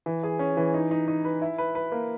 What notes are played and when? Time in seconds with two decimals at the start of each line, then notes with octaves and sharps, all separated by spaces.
0.06 E3
0.23 G#4
0.39 C#4
0.57 E3
0.74 D#4
0.91 D#4
1.08 D#4
1.25 B4
1.42 E4
1.58 B4
1.75 B4
1.92 A#3